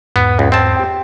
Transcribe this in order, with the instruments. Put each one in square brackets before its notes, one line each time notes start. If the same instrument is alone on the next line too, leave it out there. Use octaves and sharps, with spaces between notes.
[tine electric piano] E2 G#2 [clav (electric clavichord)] B3
[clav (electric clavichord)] C#2
C4 A5
[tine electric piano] G4 G5